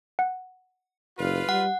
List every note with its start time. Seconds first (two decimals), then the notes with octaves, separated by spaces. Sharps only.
0.19 F#5
1.18 F#1 F4 B4 F5
1.49 G3 F#5